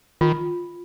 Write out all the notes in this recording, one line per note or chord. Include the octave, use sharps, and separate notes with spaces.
D#3 F4